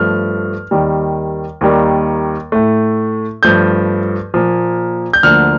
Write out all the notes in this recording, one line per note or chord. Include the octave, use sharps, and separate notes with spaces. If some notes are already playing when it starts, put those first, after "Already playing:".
Already playing: G2 F3 A3 F6
D#2 D#3 G3
D#2 D#3 G3 A#3
A2 A3
G2 F3 A3 G6
A#2 F3 A#3
G6
D2 D3 F3 A#3 F6